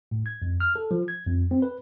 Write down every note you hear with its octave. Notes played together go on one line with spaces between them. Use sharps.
A2
G#6
F2
F6
A4
F3
G#6
F2
C4
B4